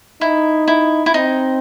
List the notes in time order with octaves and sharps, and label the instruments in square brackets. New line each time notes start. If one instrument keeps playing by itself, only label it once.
[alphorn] D#4 [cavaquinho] E4
[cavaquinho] E4
E4
[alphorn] C4 [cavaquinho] D#4